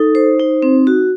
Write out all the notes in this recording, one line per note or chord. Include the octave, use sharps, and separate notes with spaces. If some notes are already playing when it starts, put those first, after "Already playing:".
Already playing: D#4 A4
C5
D#4
C4
F#4